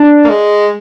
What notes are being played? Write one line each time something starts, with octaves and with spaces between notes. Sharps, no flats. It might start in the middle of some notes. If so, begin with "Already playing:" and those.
Already playing: D4
A#3
G#3